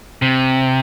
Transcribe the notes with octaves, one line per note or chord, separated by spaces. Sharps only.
C3